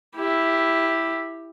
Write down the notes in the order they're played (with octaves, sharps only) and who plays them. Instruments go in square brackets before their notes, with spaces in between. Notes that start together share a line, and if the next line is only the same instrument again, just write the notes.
[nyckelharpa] E4 G4